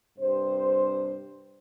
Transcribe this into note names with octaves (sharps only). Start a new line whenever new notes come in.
G2 C3 C5